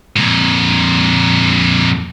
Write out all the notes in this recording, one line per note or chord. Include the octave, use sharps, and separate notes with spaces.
F2 A#2